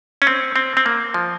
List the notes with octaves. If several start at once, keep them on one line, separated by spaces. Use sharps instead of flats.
C#4
C4
C4
C4
A#3
F3